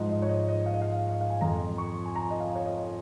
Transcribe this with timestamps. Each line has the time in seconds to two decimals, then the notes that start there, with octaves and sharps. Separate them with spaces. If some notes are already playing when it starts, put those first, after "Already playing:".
Already playing: G#2 F3 D#5
0.11 D#5
0.22 C#5
0.29 D#5
0.48 D#5
0.66 F5
0.74 D#5
0.82 F5
1.10 D#5
1.21 F5
1.30 G#5
1.41 F2 F3 A#5
1.78 C#6
2.05 G#5
2.16 A#5
2.31 D#5
2.40 F5
2.55 C#5
2.66 D#5